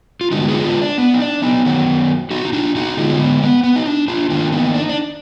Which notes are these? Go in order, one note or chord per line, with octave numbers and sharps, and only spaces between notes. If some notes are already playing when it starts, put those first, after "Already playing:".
F4
D3 G#3 B3 D#4 F#4
F4 G#4
D4 F4
D4
B3
D#4
D4
B3 D#4
D#3 F#3 B3
D#4 F#4
D#4
D4 F4
D#4 F#4
D3 G#3 B3 F4 G#4
B3
B3
B3
D#4
D4
D4 F4
D#3 A#3 D4 F4
B3 D#4
D4
D#4
D4